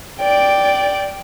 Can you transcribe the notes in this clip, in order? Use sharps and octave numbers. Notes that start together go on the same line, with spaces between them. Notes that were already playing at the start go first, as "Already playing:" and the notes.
D5 G5